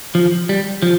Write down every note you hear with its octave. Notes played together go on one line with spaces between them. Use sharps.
F3
G3
F3